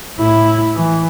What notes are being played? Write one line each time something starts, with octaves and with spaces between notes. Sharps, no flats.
A2 E4
E3